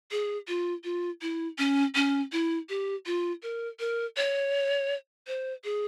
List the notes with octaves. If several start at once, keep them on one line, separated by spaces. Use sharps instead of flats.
G#4
F4
F4
E4
C#4
C#4
E4
G4
F4
A#4
A#4
C#5
C5
G#4